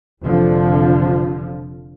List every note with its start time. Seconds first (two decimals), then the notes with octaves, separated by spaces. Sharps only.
0.22 F1 D3 F3